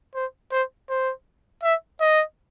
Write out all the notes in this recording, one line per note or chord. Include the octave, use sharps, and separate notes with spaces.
C5
C5
C5
E5
D#5